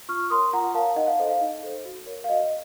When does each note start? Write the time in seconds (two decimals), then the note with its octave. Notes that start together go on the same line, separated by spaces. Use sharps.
0.09 F4 C#6 F6
0.30 A#4 C#5 C6 D#6
0.53 F4 F#5 A#5
0.74 A#4 C#5 F5 A5
0.96 D#4 D#5 F#5
1.07 F5
1.19 A4 C5 D#5
1.29 F5
1.41 D#4
1.63 A4 C5
1.85 F#4
2.06 A#4 C#5
2.24 F5
2.29 F#4 D#5
2.40 D#5